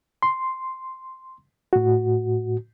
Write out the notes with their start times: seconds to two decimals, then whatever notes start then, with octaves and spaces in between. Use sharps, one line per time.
0.23 C6
1.73 A2 F#4